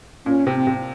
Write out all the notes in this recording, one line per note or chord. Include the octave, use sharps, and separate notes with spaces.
A#2 C#4
C3
C4
C3